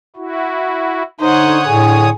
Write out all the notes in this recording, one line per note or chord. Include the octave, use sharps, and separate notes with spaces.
E4 F#4
D3 D#4 C5 C#5 F#5 D#6
A2 G#4